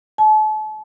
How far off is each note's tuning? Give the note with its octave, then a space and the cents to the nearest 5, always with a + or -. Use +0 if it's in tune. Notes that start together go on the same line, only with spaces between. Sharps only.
A5 -40